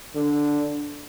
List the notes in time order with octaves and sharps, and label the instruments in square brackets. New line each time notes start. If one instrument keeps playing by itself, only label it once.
[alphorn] D3